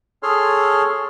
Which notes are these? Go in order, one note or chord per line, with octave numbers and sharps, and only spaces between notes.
G#4 A4 C#5 C6 F6